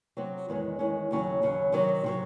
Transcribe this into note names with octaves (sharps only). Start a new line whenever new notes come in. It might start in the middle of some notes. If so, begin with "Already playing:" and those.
C3 F#3 C4 F#4
E2 D#3 G#3 C#4
E2 D#3 G#3 C#4
D#2 C#3 F#3 C#4
D#2 C#3 F#3 C#4
C3 D#3 F#3
C3 D#3 F#3